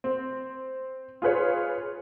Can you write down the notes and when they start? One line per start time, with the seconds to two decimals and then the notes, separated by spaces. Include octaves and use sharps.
0.04 C4
1.22 F4 G#4 B4 C#5